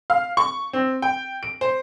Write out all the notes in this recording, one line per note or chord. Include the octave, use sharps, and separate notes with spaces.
F5
C#6
C4
G5
D7
C5